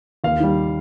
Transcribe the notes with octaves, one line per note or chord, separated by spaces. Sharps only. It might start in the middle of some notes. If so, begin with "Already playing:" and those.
D#2 F5
D#3 G3